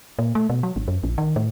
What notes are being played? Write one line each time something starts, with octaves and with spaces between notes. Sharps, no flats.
A#2
A3
B2
F#3
G#1
F#2
A#1
D#3
A2